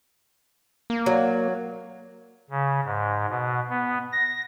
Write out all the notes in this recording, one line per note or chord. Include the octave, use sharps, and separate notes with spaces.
A#3
F#3
C#3
G#2
B2
B3
A#6